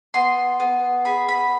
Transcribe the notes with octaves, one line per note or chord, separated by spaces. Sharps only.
B3 C6
B3
G#4 B5
B5